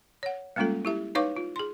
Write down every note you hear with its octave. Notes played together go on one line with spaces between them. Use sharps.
C#5 F#5
G3 G#3 A#3 C#4 F4 A4
E4 G4 E5
D#4 B4 C#5 F5 C#6 D6
F4
G#4 C6